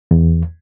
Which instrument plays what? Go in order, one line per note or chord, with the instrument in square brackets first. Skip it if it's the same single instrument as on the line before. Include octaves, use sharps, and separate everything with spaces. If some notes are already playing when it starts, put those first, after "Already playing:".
[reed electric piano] E2